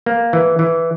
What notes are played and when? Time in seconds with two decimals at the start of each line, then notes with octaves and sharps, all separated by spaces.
0.06 A#3
0.33 E3
0.59 E3